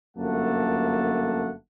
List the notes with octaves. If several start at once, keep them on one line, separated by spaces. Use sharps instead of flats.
G1 F#2 A3 A#3 F#5 A5